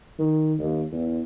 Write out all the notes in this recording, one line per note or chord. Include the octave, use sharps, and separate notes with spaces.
D#3
D#2
E2